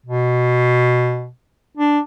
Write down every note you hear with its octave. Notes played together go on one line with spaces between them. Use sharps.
B2
D4